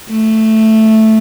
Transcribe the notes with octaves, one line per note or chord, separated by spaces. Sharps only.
A3